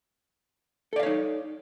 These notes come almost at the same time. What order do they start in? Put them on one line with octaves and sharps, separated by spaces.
A4 D5 F5 C#5 D#4